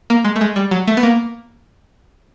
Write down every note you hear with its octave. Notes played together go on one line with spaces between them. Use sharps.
A#3
G#3
A3
G#3
G3
F#3
A3
B3
A#3